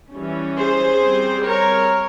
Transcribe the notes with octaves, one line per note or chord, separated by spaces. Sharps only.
E3 G3 C#4
G#4 C5
G3 C4
A#4 C#5